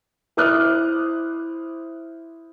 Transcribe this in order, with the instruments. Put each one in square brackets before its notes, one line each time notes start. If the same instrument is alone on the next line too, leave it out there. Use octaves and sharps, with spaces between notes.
[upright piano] E4 C5 D6 D#6 F6 F#6